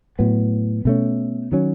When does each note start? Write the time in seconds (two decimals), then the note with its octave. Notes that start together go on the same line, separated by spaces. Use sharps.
0.19 A2 F#3 B3
0.85 B2 A3 C#4
1.52 D#3 F#3 C#4